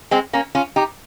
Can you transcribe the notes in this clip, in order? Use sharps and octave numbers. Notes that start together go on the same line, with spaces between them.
G#3 C4
A#3 C#4
C#4 F4
D#4 G4